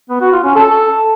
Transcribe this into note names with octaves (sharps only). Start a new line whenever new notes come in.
B3
F#4
F4
C#4
A4